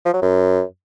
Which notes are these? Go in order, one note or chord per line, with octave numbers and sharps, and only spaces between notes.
F3
F#3
F#2